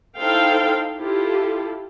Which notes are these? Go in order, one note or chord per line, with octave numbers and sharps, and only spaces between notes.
D#4 E4 A4 C5 F5 G5
E4 F4 G4 A4